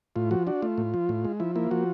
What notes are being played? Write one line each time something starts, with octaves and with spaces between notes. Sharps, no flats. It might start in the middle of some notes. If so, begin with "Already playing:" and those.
A2 F4
F3 F#4
D4 F#4
A3 F4
A2
F3
A2
G#3
F3 E4
A#3 E4
F3 F#4